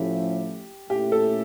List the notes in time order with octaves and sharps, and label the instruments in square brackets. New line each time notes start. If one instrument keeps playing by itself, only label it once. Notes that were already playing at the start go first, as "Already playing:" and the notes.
Already playing: [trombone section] A2 F3 A3 C#4 E4 [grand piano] G4
[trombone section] A#2 A3 C#4 E4 [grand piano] G4
[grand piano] A4